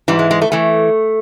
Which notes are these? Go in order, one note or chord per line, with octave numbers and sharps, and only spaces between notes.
G#2 E3 G3
G#3
G#3
A3
E3 A3